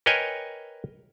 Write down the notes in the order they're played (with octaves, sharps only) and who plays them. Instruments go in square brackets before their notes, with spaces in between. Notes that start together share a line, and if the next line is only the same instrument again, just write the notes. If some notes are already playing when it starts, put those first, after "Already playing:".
[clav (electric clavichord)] A#4 B4 C#5 D#5 G5 G#5